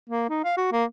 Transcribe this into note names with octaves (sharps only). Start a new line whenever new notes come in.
A#3
D#4
F5
F#4
A#3